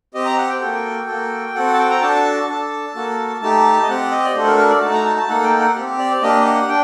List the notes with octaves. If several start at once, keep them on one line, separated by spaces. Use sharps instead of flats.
C4 G4 D#5
A#5
F#5
G5
A#3 F#4 A4
A#3 F#4 A4
C4 F#4 A4 F#5
A5
G5
A#5
D4 F#4 A4 A5
D4 A4 A5
A#3 F#4 A4
A3 D#4 G4 A5
D#5
C4 G4 F#5
D#5
D5
A3 D4 F#4 A4 C5
A#4
A#4
D5
A3 D#4 F#4 A5
A#5
A5
A5
A#3 D#4 A4 F#5
G5
F#5
C4 G4
D5
A#3 D4 G4 D#5
F#5
D4 G5